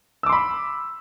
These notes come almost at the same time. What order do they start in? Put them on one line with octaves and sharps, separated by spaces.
E6 D6 C6 B5